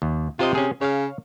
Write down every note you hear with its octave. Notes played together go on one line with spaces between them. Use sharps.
D#2
C3 F4 C5 D#5
C#4 G#4
C#3 C#5 F5